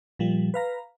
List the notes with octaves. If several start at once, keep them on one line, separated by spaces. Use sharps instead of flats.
A#2 F3 G3
B4 F5 A#5